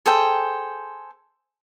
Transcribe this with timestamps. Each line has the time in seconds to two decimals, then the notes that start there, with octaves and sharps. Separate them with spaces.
0.06 G#4 A4 C5 G5